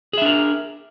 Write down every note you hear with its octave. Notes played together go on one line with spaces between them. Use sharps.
D4 G#4 A#4 E5